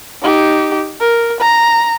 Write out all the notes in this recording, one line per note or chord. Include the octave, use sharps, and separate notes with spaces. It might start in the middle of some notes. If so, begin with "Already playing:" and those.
D#4 G4
A#4
A#5